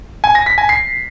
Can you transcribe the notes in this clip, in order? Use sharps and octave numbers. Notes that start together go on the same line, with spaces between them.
G#5
A#6
B6
G#5
C7